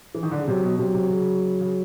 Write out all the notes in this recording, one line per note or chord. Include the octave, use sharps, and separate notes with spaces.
E3
D#3
D3
C#3
C3 F#3
B2
C3 F#3
C3
C#3
C#3